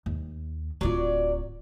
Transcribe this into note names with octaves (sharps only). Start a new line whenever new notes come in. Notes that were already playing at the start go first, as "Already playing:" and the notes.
D#2
D1 F#3 F4 D5